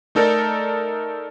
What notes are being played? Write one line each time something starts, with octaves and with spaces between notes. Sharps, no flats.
A3 D#4 A4 A#4 D5